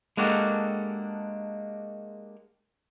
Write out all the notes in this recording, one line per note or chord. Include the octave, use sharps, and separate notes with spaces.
G#3 A#3 D4 F#4 G4 A4